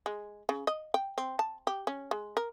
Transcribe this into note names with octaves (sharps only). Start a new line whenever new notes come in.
G#3
C#3
D#5
G5
C4
A5
G4
C#4
G#3
A#4